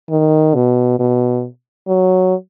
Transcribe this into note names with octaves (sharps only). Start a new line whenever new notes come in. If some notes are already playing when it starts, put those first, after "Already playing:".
D#3
B2
B2
F#3